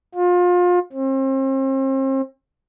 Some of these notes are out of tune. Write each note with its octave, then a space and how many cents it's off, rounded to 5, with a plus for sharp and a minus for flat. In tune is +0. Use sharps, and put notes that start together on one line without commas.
F4 +30
C4 +40